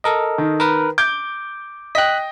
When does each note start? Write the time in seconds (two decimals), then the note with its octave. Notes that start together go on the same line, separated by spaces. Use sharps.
0.04 A4 A#4 D#5
0.38 D#3
0.60 A#4 B4
0.98 D6 G6
1.95 D#5 G5 F#6 B6